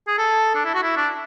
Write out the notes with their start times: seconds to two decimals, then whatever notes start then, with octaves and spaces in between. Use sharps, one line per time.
0.08 G#4
0.18 A4
0.55 D4
0.65 E4
0.75 F#4
0.83 E4
0.97 D4